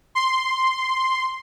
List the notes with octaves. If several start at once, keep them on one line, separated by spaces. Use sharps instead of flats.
C6